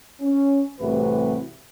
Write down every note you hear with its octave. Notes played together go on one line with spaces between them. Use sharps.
C#4
C2 A2 C3 E3 F#4 B4